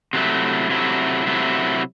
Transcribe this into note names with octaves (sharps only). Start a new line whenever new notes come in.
C3 F#3 A3 E4
C3 F#3 A3 E4
C3 F#3 A3 E4